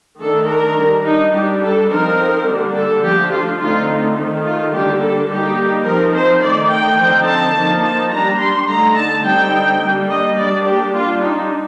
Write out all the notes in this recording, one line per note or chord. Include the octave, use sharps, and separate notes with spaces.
D#3 A3 D4 A4
A#4
G3 D4
D#4
G3 D4 G4
A4
F3 C4 D#4 A#4
D3 G3 A#3 D4
A4
F3 A3 D4 G4
F4
D3 A3 C4 D#4 F4
D#3 A3 D#4
F4
D3 G3 A#3 D4 G4
A4
G3 A#3 D#4 G4
F3 C4 D#4 A#4
C5
D#3 A3 D#4 D5
G5
D3 F3 C4 D#4
A5
F3 A#3 D#4
A5
G3 D4 A#5
C6
D3 A3 D#4 A#5
A5
D3 G3 C4 D#4 G5
G3 A#3 D4
D#5
G3 A#3 D4 D5
G4
G3 D4 F4
D#4